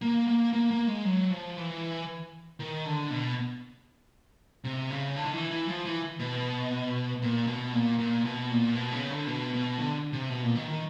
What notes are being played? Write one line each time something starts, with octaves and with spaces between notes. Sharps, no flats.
A#3
A#3
A#3
A#3
G#3
F#3
F3
E3
D#3
D3
B2
C3
C#3
D3
D#3
E3
E3
F3
E3
B2
A#2
B2
A#2
A#2
B2
A#2
B2
C#3
D3
B2
B2
D3
C3
B2
A#2
D#3
D#3